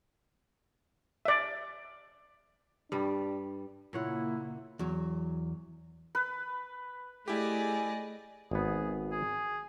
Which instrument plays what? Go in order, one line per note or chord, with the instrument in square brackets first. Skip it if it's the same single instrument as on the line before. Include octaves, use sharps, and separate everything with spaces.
[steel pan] D5 E5
[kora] G2 G3 [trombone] D4
[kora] A#2 C#5 F#5 [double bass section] C#3 A#3 [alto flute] E4
[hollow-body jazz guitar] E2 F#3
[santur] B4
[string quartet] A3 D5 D#5 [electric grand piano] E4 G4 [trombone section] G#4
[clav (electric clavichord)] G#1 B3 [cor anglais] G#4
[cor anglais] G#4